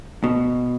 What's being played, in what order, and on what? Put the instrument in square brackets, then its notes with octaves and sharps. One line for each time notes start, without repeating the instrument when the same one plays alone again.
[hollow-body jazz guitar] B2